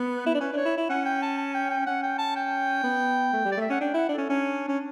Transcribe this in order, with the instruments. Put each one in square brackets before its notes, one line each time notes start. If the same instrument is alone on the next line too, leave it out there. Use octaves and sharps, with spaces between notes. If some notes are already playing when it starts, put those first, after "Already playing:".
Already playing: [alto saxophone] B3
[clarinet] B4
[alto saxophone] E4
D4
[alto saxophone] C#4 [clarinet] B4
[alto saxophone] D4 [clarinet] C#5
[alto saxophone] E4
E4
[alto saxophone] C#4 [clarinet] F#5
[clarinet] G5
A5
A5
G5
G5
[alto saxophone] C#4 [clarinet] F#5
[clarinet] G5
A5
G5
[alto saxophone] B3
A3
G3
[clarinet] D5
[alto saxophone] A3 [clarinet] E5
[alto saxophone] C#4 [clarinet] F#5
[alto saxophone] D4 [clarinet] G5
[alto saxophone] E4 [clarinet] F#5
[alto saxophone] D4
[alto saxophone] C#4 [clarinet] A4
[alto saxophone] C#4 [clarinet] D4
[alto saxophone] C#4